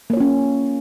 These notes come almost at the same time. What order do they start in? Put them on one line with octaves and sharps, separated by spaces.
A#3 C#5 F4 C#4